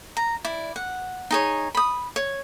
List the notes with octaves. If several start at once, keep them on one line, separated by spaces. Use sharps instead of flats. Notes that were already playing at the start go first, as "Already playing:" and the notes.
A#5
E4 D5
F#5
D#4 G#4 C#5
B5 D#6
C#5